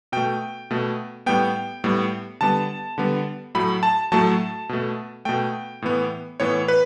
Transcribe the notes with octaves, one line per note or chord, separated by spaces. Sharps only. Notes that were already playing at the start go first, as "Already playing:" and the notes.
B2 A3 G5
B2 A3
A2 G3 B3 G5
A2 G3 B3
D3 G3 B3 A5
D3 G3 B3
A2 F#3 A3 B5
A5
A2 F#3 A3 A5
B2 A3
B2 A3 G5
A2 E3 B3
A2 E3 B3 C#5
B4